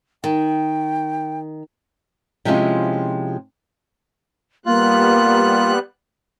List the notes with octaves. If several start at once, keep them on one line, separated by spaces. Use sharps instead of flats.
D#3 G5
C3 F3 G#3 C#4 E4 F4
G3 A#3 B3 F4 F#6